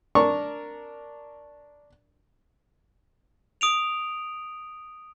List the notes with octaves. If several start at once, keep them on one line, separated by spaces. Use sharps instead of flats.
D4 A#4 C#6
D#6 D7 F7